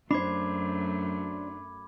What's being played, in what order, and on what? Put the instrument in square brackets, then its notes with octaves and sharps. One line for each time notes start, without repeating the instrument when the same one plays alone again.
[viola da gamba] F#2 F#3 A3 [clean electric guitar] D4 C5 [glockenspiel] B5 D6 G#6